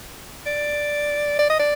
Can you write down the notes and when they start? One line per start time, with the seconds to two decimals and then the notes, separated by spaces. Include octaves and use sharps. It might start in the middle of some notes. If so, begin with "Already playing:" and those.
0.46 D5
1.39 D5
1.50 D#5
1.60 D5